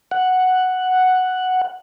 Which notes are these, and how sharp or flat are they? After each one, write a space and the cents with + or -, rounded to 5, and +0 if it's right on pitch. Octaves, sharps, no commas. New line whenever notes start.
F#5 +0